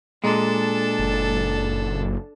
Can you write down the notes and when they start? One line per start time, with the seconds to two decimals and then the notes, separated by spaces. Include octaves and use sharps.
0.24 A#2 G#3 D4 A4
0.99 F#1